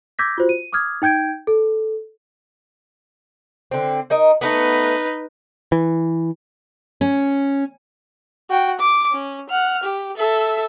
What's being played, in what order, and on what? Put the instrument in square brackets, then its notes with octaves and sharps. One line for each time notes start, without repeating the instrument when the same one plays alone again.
[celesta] D6 E6 G6 G#6 A#6 B6
F4 F#4 C5
D#7
D6 D#6 F6 G#6
D#4 G5 G6 G#6 D7
A4
[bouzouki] D3 C4
D#4 A#4 D#5
[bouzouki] A3 B3 [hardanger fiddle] D#4 B4
[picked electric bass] E3
[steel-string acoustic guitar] C#4
[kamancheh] F#4 G5
D6
C#4
F#5 F6
G4
A4 E5